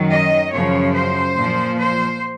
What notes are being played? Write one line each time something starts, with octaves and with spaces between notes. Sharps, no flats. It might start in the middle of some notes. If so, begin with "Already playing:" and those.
Already playing: F#2 D#3 F#3
D#5
F#2 C#3 F3 C#5
C5
A#2 F3
C5